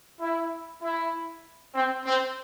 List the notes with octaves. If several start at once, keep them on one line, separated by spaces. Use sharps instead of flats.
E4
E4
C4
C4